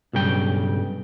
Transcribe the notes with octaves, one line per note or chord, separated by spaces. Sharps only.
B1 G2 C#3 G5